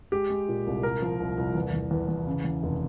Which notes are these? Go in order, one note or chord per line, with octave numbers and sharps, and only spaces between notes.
G#3 G4
G#3
A#2
C2
C2 A#4
F3
C2
C2
E2
E2
E2
E2
C#3
E2
F1